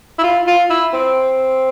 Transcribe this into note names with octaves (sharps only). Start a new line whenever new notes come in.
E4
F4
F4
E4
C4